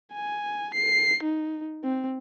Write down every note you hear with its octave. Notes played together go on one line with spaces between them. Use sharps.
G#5
C7
D#4
C4